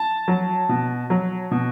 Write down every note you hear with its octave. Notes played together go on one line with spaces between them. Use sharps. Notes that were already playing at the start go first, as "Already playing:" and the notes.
Already playing: A5
F#3
B2
F#3
B2